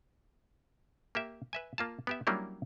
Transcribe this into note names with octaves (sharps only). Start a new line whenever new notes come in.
A#3 G4 E5
B4 E5 G#5
A#3 F4 A5
B3 G4 E5
F#3 G3 A#3 C#4 D4 E4